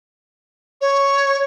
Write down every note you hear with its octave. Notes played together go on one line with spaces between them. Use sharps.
C#5